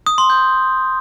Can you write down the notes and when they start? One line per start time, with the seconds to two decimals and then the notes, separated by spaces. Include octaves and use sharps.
0.07 D#6
0.18 C6
0.30 G6